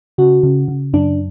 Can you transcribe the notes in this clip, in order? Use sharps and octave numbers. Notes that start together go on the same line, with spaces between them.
C#3 F#4
C#3
C#3
F#2 D4